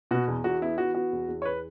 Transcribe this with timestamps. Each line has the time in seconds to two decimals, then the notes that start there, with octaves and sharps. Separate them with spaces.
0.11 B2 F#4
0.28 E2
0.44 E2 F#4
0.62 B3 E4
0.78 E3 F#4
0.95 B3 F#4
1.13 E2
1.28 E2
1.42 C#5
1.45 B4